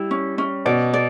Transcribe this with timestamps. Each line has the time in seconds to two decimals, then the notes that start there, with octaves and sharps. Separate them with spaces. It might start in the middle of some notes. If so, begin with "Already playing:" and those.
Already playing: G3 E4
0.11 C#4
0.38 C#4
0.66 B2 D5
0.93 D5